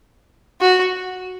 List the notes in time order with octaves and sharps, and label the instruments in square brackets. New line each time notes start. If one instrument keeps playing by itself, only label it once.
[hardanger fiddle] F#4